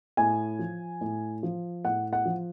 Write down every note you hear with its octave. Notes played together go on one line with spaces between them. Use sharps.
A2 G#5
F3
A2
F3
A2 F#5
F#5
F3